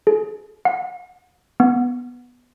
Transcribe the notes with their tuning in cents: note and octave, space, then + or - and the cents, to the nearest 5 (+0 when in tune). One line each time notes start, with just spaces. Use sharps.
G#4 +35
F#5 -35
B3 -5